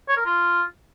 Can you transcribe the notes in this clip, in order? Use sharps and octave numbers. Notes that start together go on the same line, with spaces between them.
C#5
A#4
F4